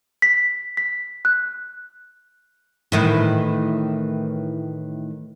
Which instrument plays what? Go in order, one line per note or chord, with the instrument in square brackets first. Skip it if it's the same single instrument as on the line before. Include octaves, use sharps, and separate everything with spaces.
[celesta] B6
B6
F#6
[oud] A2 D#3 E3